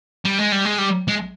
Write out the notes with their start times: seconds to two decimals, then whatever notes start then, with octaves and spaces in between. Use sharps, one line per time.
0.25 G3
0.38 G#3
0.52 G3
0.65 G#3
0.78 G3
1.08 G#3